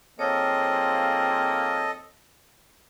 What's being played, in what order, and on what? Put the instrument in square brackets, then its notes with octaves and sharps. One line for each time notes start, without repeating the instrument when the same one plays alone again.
[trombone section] G#2 F3 C4 [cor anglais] A#3 [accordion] A4 D#5 [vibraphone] C#5